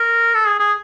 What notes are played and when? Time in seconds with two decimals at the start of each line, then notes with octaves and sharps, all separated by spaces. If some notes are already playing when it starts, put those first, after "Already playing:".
Already playing: A#4
0.34 A4
0.47 G#4
0.59 G#4